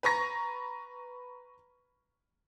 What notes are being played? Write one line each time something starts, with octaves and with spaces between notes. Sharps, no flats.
B4 A#5 C#6 A#6